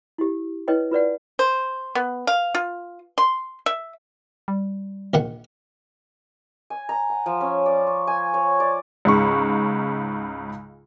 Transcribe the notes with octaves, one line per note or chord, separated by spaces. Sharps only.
E4 G4
E4 B4 C#5 D#5 G5
F4 B4 D5 F#5
C5
B3
F5
F4
C6
E5
G3
A#1 D#3 F#5
G#5
A#5
F#5
F3
C#4
D5
C#6
G#5
C#5
D5
C#2 G#2 C#3 B5 C#6